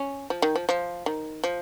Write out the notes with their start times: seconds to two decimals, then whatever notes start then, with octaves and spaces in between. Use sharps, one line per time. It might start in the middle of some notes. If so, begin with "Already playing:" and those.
Already playing: C#4
0.30 F3
0.42 D#3
0.56 F3
0.69 F3
1.06 D#3
1.44 F3